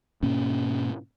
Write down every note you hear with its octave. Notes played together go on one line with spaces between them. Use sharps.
G#2 B2 A#3 C#4